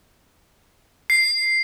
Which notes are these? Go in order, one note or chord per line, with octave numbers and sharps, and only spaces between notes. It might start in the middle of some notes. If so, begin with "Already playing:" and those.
C7